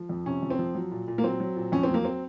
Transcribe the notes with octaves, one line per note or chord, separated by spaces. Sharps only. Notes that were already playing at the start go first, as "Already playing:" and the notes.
Already playing: F3
F2
C3 C#4
F2
C4
F3
F#3
A#2
A#2
A#3
F#3 C4
F#3
A#2
F2 C#4
C4
F#3
A#3
C4